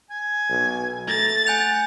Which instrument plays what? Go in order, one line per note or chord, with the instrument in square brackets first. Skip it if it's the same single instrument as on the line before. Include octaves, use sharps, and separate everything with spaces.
[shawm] G#5
[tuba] B1
[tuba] A3 [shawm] A#5 [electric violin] A6
[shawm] F#5 [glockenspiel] G#5 G6 F7